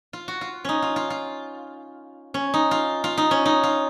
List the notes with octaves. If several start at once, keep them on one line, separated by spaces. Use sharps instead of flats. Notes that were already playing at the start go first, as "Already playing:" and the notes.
F4
F#4
F4
C#4 D#4
F4
F4
F4
C#4
D#4
F4
F4
D#4
C#4
D#4
F4